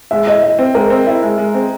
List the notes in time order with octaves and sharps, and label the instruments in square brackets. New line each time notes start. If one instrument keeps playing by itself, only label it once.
[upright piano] G#3 [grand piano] E5
[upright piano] E4 [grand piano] D#5
[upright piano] E4 [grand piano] D#5
[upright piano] C4
[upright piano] G#3 [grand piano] A#4
[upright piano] C4
E4
G#3
G#3
C4